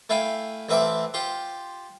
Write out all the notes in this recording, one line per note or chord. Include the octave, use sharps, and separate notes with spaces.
A3 E4 F5 G5 G#5
A1 C4 B4 E5 A5 D6
F4 G4 C5